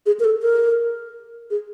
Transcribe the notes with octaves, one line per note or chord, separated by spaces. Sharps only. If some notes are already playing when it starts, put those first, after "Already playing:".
G#4
A#4
A4
A#4
G#4